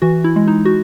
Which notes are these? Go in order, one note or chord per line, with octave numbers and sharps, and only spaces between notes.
E3 F#4
E4
G#3
D#4
F#4